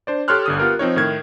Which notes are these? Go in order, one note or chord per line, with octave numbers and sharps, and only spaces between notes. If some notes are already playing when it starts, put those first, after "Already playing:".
D4 C5 D5
G4 A4 C#5 C6 F6 F#6
G1 D3 D#6
B3 F4 G4 A#4
F3 C4 D#4 C#5
A2 D#3 G#6